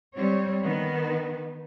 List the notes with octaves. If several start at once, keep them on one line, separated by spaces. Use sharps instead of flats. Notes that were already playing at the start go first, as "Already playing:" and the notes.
G3 C4 C#5
D#3 B3